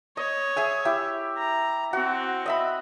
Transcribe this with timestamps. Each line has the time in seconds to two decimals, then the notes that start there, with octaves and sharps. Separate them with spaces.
0.17 C#5 D#5
0.57 G#4 E5 G#5
0.85 E4 G4 E5
1.38 A#5
1.93 C4 F#4
2.46 D#5 E5 B5